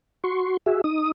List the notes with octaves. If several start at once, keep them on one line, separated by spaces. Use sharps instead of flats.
F#4 C6 C#6
F#4 G#4 E5
D#4 D#6